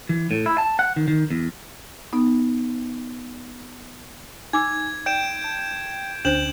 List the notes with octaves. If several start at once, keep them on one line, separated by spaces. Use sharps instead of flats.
E3
A2
E4
A5
F#5
D#3
D#3
E2
B3 D#4
D#4 G#5 D6 E6 G#6
D5 G5 G6 D7 E7
A5
D2 C#4 D4 C5 G6 E7 F#7